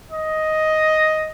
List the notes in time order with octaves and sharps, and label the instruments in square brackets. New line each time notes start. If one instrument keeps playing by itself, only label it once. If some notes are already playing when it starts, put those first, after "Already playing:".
[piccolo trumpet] D#5